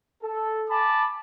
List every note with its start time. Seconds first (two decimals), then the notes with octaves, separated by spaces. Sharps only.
0.23 A4
0.69 G#5 A5 B5 D6